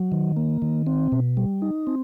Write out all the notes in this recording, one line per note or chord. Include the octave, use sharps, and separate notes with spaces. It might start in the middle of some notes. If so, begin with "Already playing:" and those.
Already playing: F#3
D#3
A#3
D#3
C4
B2
G3
D#4
C4